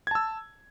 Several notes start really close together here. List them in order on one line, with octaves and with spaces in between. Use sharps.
G#6 A5 E6